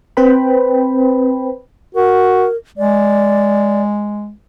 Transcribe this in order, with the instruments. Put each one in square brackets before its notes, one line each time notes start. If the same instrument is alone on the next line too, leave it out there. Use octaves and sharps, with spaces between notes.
[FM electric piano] C4 B4 C5 G5 B5
[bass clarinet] F#4 [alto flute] A#4
[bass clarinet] G#3 [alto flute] D5